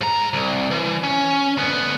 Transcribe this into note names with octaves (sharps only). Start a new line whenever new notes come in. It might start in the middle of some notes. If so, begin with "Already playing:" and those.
G#2 A#5
C2
E3
C#4
D2 B3